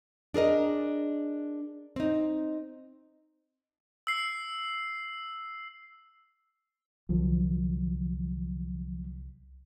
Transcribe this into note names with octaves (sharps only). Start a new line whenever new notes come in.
D4 G#4 A#4 D#5
C4 D#4
E6 C7
C2 D3 F3 F#3